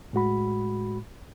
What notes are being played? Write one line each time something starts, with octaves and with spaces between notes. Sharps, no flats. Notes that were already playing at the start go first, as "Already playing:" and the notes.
A2 G#3 F#4 B5